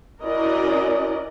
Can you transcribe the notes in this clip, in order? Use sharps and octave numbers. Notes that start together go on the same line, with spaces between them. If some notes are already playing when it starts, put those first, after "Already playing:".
C#4 E4 F#4 A#4 D5 D#5